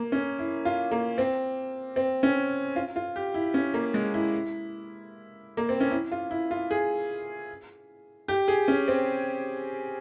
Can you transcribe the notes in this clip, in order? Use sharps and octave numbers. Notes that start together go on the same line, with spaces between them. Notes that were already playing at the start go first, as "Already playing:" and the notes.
Already playing: A#3
C#4
E4
F4
A#3
C4
C4
C#4
F4
F4
G4
E4
C#4
A#3
G#3
E4
A#3
C4
C#4
E4
F4
E4
F4
G#4
G4
G#4
C#4
C4